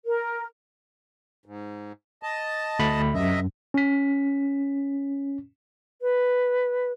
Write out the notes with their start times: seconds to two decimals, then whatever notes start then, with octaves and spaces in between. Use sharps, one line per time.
0.05 A#4
1.46 G#2
2.23 D#5 A5
2.79 D2 A3 B5
3.14 F#2 C3 D#5 E5
3.74 C#4 B6
6.02 B4